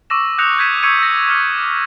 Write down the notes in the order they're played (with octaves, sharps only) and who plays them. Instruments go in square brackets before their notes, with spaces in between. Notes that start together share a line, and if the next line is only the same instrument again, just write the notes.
[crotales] C#6 D6 E6 A#6 E7
D#6 F#6 G6 A#6 C#7 F7
G6 G#6 B6 D#7 E7
C#6 E6 G#6 C#7 D#7
E6 A#6
D6 F6 C#7